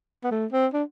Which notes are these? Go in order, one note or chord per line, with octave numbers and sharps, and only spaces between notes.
B3
A3
C4
D4